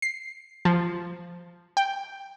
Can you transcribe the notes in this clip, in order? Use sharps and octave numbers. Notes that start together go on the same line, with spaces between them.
C7
F3
G5